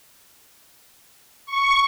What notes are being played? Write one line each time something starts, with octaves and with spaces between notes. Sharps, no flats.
C#6